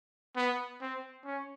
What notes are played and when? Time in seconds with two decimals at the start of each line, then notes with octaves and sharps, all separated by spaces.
0.36 B3
0.81 C4
1.25 C#4